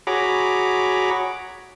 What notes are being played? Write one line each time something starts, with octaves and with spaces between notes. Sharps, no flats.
F#4 G#4 C#5 A#5 B5 D6